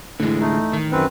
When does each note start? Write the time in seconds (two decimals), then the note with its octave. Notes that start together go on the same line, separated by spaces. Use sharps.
0.20 A2 D3 E3 G#3
0.40 A3 D#4
0.73 D#3
0.92 F#2 C4 B4